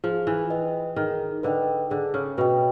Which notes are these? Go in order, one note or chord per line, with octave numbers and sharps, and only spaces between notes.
F3 G#4
E3
B4 D#5 G5
D#3 G#4
D3 B4 D#5 G5
D3 G#4
C#3
B2 B4 D#5 G5